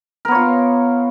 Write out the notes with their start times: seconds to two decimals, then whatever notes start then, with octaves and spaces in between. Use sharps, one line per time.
0.25 A#4
0.28 B3
0.32 C#5
0.35 F4